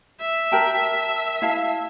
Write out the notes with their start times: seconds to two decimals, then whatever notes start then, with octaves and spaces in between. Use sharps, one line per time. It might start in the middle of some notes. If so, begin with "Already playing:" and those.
0.20 E5
0.52 A#4 G5 A5
1.42 E4 F5 A5